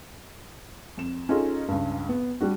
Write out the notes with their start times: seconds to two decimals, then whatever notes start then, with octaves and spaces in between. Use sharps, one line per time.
0.97 F2 E7
1.29 C#4 D#4 F4 G#4 A4
1.68 C#2 G2
2.09 B3
2.41 G3 D4 F#4